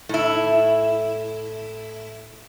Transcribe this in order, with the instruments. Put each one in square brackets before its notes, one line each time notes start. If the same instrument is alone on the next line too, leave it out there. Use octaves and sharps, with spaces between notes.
[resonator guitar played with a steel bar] A2 E4